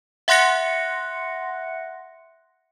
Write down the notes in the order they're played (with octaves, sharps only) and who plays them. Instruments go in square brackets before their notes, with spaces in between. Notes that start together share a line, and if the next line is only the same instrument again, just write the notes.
[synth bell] E5 F#5 C6 F#6 A#6 C#7